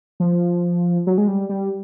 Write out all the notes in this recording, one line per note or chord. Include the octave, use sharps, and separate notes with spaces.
F3
F#3
G#3
G3
G3